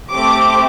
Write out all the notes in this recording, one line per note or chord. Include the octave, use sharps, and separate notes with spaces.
A3 C4 G4 D6